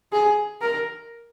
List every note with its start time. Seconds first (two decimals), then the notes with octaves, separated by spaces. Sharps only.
0.13 G#4
0.62 A#4